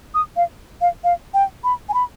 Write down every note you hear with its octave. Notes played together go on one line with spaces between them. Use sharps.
D#6
F5
F5
F5
G5
B5
G#5
B5